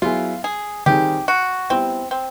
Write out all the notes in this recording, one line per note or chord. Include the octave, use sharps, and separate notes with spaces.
F#3 B3 E4 F4 G#4
G#4
D#3 G3 C4 D#4 G4 G#4
F#4
G3 B3 C4 E4
C4